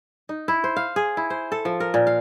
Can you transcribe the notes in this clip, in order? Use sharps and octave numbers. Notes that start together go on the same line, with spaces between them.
D#4
E4
C5
F5
G#4
E4
C5
A4
F3
A#4
A#2
F5